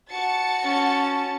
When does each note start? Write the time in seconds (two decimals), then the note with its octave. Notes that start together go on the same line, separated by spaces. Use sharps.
0.11 F#4 A5 A6 C#7
0.64 C#4 A5